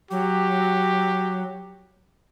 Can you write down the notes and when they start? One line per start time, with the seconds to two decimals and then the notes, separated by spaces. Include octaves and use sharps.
0.11 F#3 G4